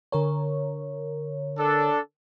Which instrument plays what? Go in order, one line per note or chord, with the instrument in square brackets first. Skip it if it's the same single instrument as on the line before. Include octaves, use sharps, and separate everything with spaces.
[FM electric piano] D3 A#4 C#5
[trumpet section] D4 A4